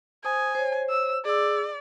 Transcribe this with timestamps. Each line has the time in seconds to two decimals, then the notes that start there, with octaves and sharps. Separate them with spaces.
0.25 C5 G#5 D#6
0.55 C5 C#5
0.90 E6
1.25 G#4 D5 E6